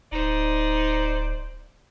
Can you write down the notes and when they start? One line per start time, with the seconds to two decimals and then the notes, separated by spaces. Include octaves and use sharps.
0.12 D1 D#4 C5 D5